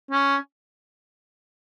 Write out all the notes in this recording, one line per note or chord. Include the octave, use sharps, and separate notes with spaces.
C#4